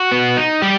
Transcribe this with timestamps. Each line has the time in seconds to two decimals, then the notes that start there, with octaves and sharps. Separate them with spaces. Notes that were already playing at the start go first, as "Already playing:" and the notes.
Already playing: F#4
0.12 B3
0.36 D#4
0.62 G3 G4